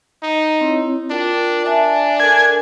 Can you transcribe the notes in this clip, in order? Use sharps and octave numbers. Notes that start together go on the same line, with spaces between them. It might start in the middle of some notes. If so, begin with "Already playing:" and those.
D#4
C4 E4 C#5
D4 F4 A#4 G5
D4 E5 G#5 A5
A4 A#4 G#5